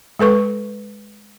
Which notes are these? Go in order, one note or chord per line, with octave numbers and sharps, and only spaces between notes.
G#3 A4 B4 C#6